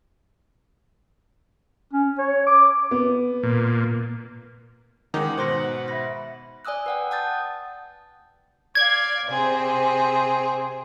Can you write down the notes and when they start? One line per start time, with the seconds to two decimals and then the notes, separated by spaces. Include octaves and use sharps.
1.93 C#4
2.18 C#5
2.47 D6
2.91 B3
3.43 A#2
5.14 D#3 G#3 C#4 D#4 F#5 D6
5.38 G#2 B2 C5 C6 A#6
5.88 E5 B5 A#6
6.65 D5 G#5 D#6 E6 F#6
6.86 B4 F#5 G5
7.11 F#5 A5 D#6 G6 A6
8.75 D5 F5 G#6
9.28 C3 C4 G#4